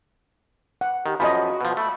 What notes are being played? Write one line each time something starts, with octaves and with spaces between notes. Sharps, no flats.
F#5
D#3 G4
F#2 F3 F#4 D#5 G#5 B5
B2 F3
A3 B5